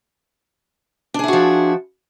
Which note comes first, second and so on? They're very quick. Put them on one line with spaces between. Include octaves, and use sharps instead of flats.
D4 G#4 E4 F#4 F3